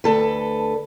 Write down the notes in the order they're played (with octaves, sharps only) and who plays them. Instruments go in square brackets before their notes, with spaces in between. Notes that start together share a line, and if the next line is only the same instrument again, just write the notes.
[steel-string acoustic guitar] D2 A4 B4